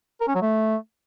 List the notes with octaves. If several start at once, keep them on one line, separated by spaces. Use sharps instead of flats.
A#4
C#4
F#3
A3